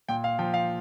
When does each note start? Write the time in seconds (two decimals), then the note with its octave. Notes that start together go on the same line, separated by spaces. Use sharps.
0.09 A#2 G5
0.24 F5
0.39 F3 G5
0.54 F5